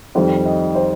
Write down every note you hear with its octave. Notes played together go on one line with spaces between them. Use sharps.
F2 D#3 G3 C5
D#5
C5